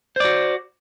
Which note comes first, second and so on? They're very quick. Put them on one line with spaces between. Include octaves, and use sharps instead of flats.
C5 D5 F#4